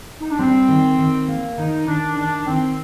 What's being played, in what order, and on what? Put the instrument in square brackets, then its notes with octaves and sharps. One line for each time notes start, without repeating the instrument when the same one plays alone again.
[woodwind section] D#4
D4
[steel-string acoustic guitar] G3 [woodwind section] C4
[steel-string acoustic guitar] D#3
D#3
A#3
[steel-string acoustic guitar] D#3 [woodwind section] D#4
[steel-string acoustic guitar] D#3 [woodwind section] D4
[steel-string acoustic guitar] D#3 [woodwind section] D4
[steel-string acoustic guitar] D#3 [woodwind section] C4